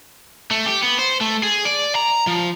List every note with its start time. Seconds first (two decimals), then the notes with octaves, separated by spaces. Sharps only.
0.51 A3
0.66 G4
0.82 B3
0.99 C5
1.21 A3
1.43 G#4
1.65 D5
1.95 A#5
2.27 F3